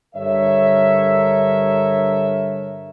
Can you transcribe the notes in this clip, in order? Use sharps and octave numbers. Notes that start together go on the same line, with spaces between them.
G2 D3 A4 A#4 C#5 E5